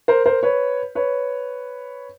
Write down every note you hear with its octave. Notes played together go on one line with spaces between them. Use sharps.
A#4 C5
A#4 C5
B4 C#5
B4 C#5